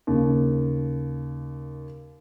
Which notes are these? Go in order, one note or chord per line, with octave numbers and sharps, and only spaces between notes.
D#2 C#3